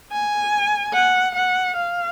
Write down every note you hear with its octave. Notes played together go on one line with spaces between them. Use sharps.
G#5
F#5
F#5
F5